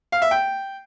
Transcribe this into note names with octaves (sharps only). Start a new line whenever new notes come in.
F5
E5
G5